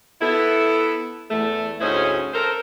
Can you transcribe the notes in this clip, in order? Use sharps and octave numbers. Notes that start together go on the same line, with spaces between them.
B3 E4 A4
E2 A3
D2 G#2 C#4 E4 C5 D#5
A4 A#4 C5